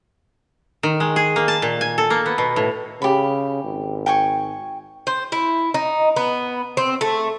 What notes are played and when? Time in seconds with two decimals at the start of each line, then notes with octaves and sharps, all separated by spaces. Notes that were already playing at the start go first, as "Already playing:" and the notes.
0.83 D#3
1.00 G#3
1.16 G#4
1.36 A#3
1.48 A5
1.62 A#2
1.81 G#5
1.98 A4
2.10 A#3
2.26 B3
2.38 B2
2.56 A2
3.02 C#3 G4 B5
3.65 G#1
4.06 G5 G#5 C#6
5.07 C5
5.32 E4
5.74 D#4
6.16 B3
6.77 C4
7.01 A3